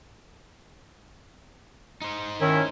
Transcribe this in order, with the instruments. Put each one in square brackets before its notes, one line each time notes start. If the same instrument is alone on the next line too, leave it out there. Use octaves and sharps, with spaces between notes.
[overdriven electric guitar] D#4 C5
[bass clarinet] D#3 [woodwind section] C#4 E4